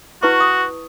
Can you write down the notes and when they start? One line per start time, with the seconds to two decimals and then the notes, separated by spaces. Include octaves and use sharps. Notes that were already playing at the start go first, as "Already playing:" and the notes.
0.23 E4 F#4 B4 C#6
0.40 D#6